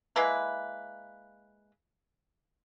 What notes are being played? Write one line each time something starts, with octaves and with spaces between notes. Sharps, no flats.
G#3 A#3 E4 B4